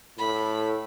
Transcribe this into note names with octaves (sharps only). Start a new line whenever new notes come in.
A2 B5